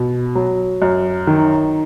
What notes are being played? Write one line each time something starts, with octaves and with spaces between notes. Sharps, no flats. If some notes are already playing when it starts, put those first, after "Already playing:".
Already playing: B2
F#3
F#2
D#3